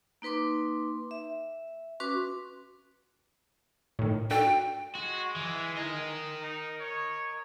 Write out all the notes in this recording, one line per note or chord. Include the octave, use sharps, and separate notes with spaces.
A#3 D#4 B4 C6 D6
E5
C#4 F#4 B4 C6 D6
A2 D#3
D4 F#4 A4 G5
G#3 F#4
E3
A#4 D#5
D#4
C#5